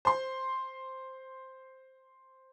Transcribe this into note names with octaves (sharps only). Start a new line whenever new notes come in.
C5 C6